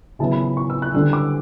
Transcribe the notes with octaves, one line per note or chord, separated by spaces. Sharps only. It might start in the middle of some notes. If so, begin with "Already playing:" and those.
C#3 F#3 B3 E4 A5
B5
B5
C#6
E6
F#6
D3 G3 D4 E6
D6